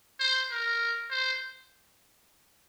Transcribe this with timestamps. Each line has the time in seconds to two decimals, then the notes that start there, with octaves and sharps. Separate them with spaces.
0.20 C5
0.51 A#4
1.10 C5